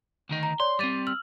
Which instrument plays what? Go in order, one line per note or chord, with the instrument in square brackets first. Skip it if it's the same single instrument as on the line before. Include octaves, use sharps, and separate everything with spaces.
[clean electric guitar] D2 D#3 D#4
[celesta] A#5
[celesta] C#5 D5 [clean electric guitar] C6
[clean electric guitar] G3 C4 [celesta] D6 A6 D#7
[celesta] E6 F6 F#7